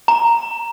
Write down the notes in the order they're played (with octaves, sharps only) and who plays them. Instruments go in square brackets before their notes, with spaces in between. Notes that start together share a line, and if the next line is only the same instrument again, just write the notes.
[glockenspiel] A#5